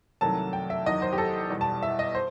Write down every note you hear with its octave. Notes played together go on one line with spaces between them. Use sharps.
C2 C3 D#3 F#3 A3 A5
G5
E5
E2 D#3 F#3 D#5
C5
G4
A4
E2 B2 G3
A5
E5
D#5
C5